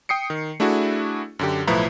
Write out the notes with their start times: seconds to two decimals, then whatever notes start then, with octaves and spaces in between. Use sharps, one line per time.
0.09 G5 D#6 C7 C#7
0.30 D#3
0.60 A3 D4 E4 F#4 G#4
1.39 F#2 D3 G4
1.67 B1 A2 F3 E4 B4 A#5